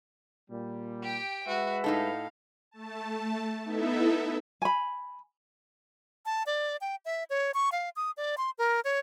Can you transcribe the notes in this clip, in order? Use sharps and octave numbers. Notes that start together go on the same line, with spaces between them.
A#2 G3
G4 G5
G#3 F#4 B4 E5
A2 D#4 A4 F5
A3 A5
B3 D#4 E4 A4 E5
G#5 B5
A5
D5
G5
E5
C#5
C#6
F5
D#6
D5
C6
A#4
C#5